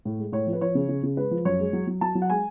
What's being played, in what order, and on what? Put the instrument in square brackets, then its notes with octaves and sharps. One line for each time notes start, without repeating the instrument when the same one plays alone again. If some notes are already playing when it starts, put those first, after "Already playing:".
[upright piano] A2
G#3
A2 C#5
F3
B4
F3 C#5
C#3
C#3
C#3
G#3 B4
F3
F#2 C#5
G#3
F#3
F#3
F#3 A5
F#3
F#5
G#3 G#5